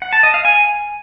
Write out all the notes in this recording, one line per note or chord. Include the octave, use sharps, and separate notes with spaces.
F#5
A5
D#5
F5
G#5